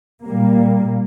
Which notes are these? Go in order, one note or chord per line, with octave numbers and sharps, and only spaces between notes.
A#2 G3 A#3